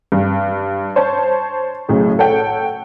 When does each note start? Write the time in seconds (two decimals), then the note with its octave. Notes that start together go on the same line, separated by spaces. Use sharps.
0.12 G2
0.96 C5 C#5 A5
1.89 B1 A2 C#3
2.19 A4 C#5 F#5 G5